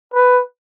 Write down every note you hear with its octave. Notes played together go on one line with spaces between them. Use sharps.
B4